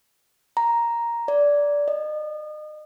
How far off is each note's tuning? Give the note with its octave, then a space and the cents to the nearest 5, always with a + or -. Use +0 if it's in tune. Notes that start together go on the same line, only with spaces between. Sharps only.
A#5 +5
D5 -15
D#5 -35